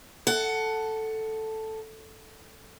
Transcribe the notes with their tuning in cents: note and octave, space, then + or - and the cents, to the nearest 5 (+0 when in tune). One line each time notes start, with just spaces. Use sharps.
A4 +0 F#5 +10